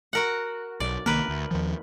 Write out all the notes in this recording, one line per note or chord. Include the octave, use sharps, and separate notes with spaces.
F#4 A#4 F#5
B1 D5
C2 D#3 A#3 A#4 B4
D2
D#2 D#3 F3